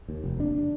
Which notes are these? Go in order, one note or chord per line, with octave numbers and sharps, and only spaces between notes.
D#2
F1
C3 D4